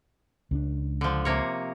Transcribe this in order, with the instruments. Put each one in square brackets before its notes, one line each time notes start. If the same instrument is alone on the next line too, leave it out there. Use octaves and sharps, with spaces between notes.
[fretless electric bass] C#2 C4 D4
[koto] D3 F3
C3 A#3 C#5